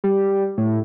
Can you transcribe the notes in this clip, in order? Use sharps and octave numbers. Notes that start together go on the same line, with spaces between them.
G3
A2